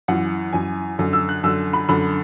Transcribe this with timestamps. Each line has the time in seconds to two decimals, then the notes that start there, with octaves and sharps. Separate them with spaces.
0.08 F#2 E3 F#5
0.53 F#2 E3 G#5
0.98 F#2 D3
1.13 E6
1.29 F#6
1.43 F#2 D3 E6
1.73 B5
1.89 F#2 D3 B5